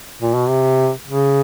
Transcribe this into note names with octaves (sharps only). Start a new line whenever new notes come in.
A#2
B2
C3
C#3